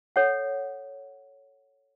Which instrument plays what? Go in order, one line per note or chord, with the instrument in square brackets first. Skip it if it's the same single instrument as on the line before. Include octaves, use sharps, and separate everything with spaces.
[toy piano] A4 C#5 F#5